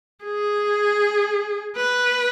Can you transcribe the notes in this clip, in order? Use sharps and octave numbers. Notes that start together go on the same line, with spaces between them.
G#4
B4